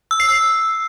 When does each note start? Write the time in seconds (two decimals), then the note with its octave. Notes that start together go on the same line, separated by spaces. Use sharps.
0.11 E6
0.20 C7
0.29 E6